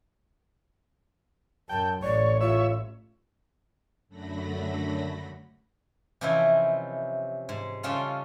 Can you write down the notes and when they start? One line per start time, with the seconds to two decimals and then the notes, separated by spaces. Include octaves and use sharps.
1.69 F#2 G5 A5
2.02 A1 C#5 D5
2.41 F4 C#5 E5
4.08 F#2 D3 F#3 A3 B5 A#6
6.21 C3 E3 F3 C#4 D#4 E4
7.49 G#2
7.83 C#3 G3 C#4 F4 A4 F5